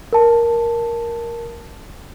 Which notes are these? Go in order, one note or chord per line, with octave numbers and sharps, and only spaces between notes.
A#4 A5